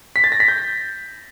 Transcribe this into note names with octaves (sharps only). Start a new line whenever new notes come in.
B6
A6
A#6
B6
G6